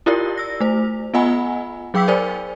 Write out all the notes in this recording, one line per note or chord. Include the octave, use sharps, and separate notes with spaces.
E4 F4 G4 A#4 D5
E6 A#6
A3 C5
B3 F4 D#5 F#5 G#5 B5
F#3 G#4 G5 D6 E6 B6
A#4 C5 D5 G#5